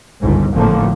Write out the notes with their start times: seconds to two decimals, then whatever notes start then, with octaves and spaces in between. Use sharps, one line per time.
0.20 G1 C#2 G#2
0.52 G#1 A2 D3 F3 A3 A#3